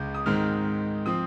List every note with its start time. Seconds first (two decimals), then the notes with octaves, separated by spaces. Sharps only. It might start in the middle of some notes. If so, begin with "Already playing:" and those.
Already playing: C#2 C#3 G#3 G6
0.15 D#6
0.26 G#2 D#3 G#3 C4 F6
1.06 F3 C4 D#6